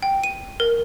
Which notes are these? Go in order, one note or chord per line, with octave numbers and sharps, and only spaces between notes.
G5
D#7
A#4